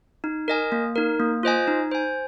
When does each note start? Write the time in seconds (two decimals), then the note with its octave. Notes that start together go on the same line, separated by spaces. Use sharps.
0.24 D#4
0.48 A#4 D#5 G#5
0.72 A#3
0.96 D#4 A#4
1.20 A#3
1.43 F4 C5 D#5 G#5
1.68 D#4
1.91 C5 G#5